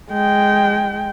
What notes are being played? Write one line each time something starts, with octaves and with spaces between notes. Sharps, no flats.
G#3 G5